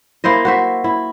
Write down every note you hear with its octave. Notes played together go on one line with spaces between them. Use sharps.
A#3 E4 C5 D#5
F#4 C5 E5
E4